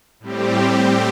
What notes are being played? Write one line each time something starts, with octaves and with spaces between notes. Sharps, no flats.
A2 G3 C4 G4